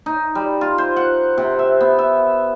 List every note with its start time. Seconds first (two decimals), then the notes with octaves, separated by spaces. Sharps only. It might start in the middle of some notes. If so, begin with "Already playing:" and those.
0.06 D#4
0.35 G3
0.61 F4
0.78 C5
0.96 F#5
1.38 C3
1.59 E5
1.81 B3
1.99 E5